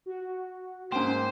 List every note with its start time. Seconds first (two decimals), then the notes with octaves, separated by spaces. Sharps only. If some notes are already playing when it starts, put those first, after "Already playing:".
0.06 F#4
0.92 G#2 A#3 C#4 C5 G5